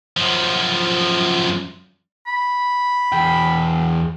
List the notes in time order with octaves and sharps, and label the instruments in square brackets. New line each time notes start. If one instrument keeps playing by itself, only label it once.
[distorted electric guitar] F#2 F3
[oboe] B5
[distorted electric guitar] E2 G5